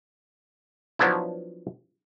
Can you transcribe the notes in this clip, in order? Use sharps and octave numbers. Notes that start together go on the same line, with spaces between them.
F3 F#3 B3 D4 E4